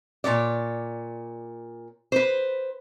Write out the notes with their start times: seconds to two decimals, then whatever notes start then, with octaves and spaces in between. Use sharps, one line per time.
0.24 A#2 F#3 C#5 D5
2.12 B4 C5